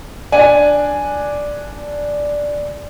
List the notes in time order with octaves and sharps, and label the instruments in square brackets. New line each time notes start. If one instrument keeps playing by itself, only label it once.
[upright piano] D4 G#5